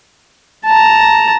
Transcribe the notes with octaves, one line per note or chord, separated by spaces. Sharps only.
A5 A#5